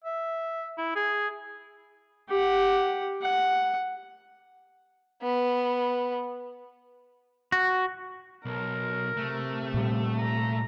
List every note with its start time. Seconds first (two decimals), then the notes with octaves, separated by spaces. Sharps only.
0.04 E5
0.78 E4
0.96 G#4
2.29 G4 F#5
3.22 F#5
5.22 B3
7.52 F#4
8.45 B1 A#4
9.17 C3 A3
9.74 A#2 G3
10.20 A#5